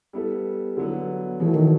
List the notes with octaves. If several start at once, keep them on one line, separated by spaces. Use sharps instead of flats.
G3 B3 E4 A4
D3 F#3 B3 E4
B2 E3 F#3 A3
D#3